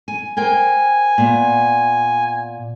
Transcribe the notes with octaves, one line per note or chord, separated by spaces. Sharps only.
G#5
A#4 C5 G5 G#5
A#2 B3